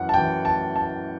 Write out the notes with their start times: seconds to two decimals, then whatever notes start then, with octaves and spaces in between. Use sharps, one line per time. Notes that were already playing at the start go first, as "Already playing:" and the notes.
Already playing: F#2 E3 F#5
0.09 A5
0.13 F#2 G5
0.18 E3
0.45 A5
0.76 A5